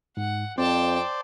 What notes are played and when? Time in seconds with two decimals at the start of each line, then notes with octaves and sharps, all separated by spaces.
0.17 G#2 F#5
0.58 F2 C4 C5 D5 G5 A5